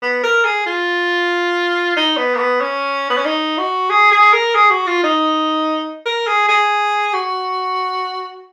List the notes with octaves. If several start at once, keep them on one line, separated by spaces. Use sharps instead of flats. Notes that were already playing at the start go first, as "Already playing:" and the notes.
B3
A#4
G#4
F4
D#4
B3
A#3
B3
C#4
B3
C#4
D#4
F#4
G#4
G#4
A#4
G#4
F#4
F4
D#4
A#4
G#4
G#4
F#4